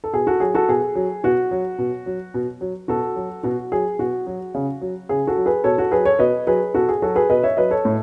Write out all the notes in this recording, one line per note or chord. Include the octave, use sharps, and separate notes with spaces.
A4
B2 G#4
F#4 A4
F#3 G#4
F#4 A4
B2 G#4
F#3
B2 F#4
F#3
B2
F#3
B2
F#3
B2 F#4 A4
F#3
B2 F#4
F#3 G#4
B2 F#4
F#3
C#3
F#3
C#3 G#4
F#4 A4
F#3
G#4 B4
B2 A4 C#5
F#4 A4
F#3 G#4 B4
A4 C#5
B2 B4 D#5
F#3 G#4 B4
B2 F#4 A4
G#4
F#3 F#4 A4
G#4 B4
B2 B4 D#5
C#5 E5
F#3 B4 D#5
A4 C#5
A2